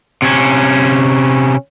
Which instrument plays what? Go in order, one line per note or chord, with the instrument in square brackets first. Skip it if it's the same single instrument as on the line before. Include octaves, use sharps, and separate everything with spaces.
[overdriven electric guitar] C3 C#4